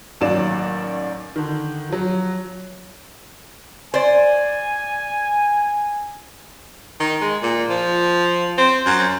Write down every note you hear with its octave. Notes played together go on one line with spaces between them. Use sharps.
A1 D#3 F#3 A#3 D5 E7
D3 D#3
F3 F#3
C5 D5 G#5
D#3
G#3
A#2
F3
C4
F#2